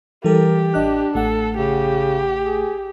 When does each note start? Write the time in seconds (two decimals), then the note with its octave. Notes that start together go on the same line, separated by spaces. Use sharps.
0.24 E3 G3 G4 A4 A#4
0.74 A1 D4 D#5 F#6
1.15 A1 A3 A4 F#5
1.57 C#3 G4
2.45 G#4